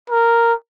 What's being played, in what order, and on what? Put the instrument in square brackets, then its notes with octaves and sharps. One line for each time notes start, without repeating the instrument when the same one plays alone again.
[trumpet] A#4